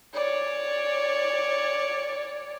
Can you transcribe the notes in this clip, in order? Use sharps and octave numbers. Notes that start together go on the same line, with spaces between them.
C#5 D5